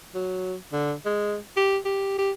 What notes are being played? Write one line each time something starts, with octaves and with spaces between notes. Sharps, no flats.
F#3
D3
G#3
G4
G4
G4